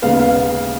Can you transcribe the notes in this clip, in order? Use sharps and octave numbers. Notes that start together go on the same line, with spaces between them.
D#2 C#3 G#3 B3 F5
F5